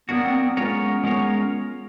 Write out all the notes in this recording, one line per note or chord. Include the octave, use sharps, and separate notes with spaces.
F#3 A#3 B3 D4 F#4
C4
B3
G#3 B3 C#4 F4 A#4 C#5
G#3 B3 C#4 F4 A#4 C#5